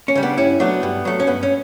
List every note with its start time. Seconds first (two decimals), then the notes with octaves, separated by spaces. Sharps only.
0.08 C#4
0.15 C#3 G3
0.23 B3 D4
0.37 G2 C#4 E4
0.60 F#3 A3 B3 D4
0.83 G2
1.05 F#3 A3
1.20 C#4
1.27 G2 B3
1.43 C#4